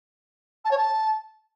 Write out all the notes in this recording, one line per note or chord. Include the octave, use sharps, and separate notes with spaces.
A5
C#5
A5